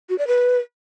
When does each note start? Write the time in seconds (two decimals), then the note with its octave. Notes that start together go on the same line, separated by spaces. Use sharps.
0.09 F#4
0.18 D5
0.27 B4